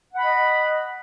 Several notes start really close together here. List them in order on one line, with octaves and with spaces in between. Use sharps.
F#5 B5 D#5